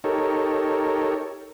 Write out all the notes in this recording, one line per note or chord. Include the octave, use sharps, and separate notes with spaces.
D#4 G4 A4 A#4 C#5